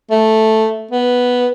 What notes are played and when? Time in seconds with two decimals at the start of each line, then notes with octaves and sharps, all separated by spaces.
0.11 A3
0.91 B3